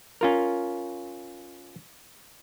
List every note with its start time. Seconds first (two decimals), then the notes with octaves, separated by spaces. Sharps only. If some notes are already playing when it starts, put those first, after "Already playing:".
0.21 C#4 F4 A#4